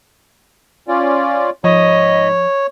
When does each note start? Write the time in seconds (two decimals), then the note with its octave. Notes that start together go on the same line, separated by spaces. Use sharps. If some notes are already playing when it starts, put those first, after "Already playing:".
0.88 C#4 F4 D5
1.64 G#2 F3 C#5 D#5 B5